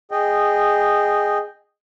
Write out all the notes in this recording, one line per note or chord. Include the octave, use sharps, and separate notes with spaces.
G#4 D#5 G5